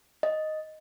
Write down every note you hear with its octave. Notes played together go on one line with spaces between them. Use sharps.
D#5